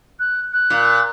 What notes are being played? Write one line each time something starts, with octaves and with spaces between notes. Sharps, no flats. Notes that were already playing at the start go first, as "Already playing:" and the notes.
F#6
F#6
A#2